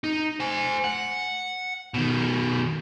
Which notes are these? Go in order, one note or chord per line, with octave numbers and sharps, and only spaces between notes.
D#4
C5 G#5
F#5
B2 D#3